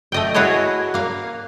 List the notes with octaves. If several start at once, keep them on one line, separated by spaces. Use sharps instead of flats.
A3 D#5 G5
E4 F#4 G#4 B4 C#5 D#5
A#3 F5